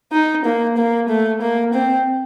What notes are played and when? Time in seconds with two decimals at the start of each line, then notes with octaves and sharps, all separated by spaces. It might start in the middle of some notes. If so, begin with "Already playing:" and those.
0.12 D#4
0.45 A#3
0.77 A#3
1.09 A3
1.41 A#3
1.73 C4